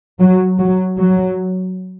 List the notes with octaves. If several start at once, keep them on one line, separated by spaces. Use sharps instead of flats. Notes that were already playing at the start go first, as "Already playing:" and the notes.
F#3
F#3
F#3